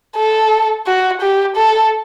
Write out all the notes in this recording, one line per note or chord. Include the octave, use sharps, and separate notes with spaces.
A4
F#4
G4
A4